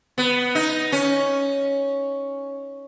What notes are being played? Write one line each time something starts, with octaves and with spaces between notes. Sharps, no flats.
B3
D#4
C#4